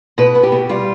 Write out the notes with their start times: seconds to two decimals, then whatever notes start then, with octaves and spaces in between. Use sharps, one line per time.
0.18 B2 B4
0.35 B3
0.43 G4
0.52 B2
0.69 G3 F4